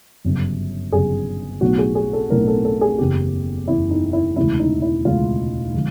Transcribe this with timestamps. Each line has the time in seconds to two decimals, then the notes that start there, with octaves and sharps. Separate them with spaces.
0.25 G1 F#2 C#3
0.92 G1 F#2 C#3 G#4
1.61 B1 A2 F#3 B3 D#4 F#4
1.78 G#4
1.95 G#4
2.13 A4
2.30 B1 A2 F#3 B3 D#4 A#4
2.47 A4
2.65 A4
2.81 G#4
2.98 F#1 E2 C#3 G4
3.68 F#1 E2 C#3 E4
3.91 D#4
4.13 E4
4.36 E1 D2 C#3 E3 G#3 E4
4.59 D#4
4.82 E4
5.05 E1 D2 C#3 E3 G#3 F4
5.74 D3 F3 G#3